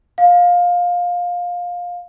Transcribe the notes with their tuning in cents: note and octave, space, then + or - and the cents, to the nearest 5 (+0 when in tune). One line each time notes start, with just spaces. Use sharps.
F5 +20